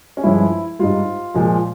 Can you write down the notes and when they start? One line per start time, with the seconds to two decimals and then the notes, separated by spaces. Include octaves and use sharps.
0.17 C#4
0.23 G2 F3 G#3 E4
0.79 G#2 G3 F4
1.34 A#2 F3 G#3